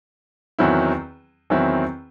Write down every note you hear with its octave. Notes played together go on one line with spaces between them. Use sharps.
E2 D#3 F#3 C4 E4
E2 D#3 F#3 C4 E4